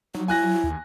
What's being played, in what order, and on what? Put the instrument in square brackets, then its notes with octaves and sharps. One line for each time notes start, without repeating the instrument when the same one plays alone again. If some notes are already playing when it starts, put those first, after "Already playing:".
[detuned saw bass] F#3 [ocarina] D#4
[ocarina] E4 [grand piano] G#5 F#6 A#6
[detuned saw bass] D#2